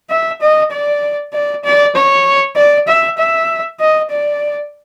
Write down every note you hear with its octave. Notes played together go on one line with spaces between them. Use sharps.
E5
D#5
D5
D5
D5
C#5
D5
E5
E5
D#5
D5